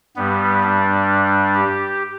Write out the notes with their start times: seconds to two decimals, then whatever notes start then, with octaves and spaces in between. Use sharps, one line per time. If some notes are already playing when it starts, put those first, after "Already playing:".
0.16 G2 G3 B3
0.63 D4
1.54 G4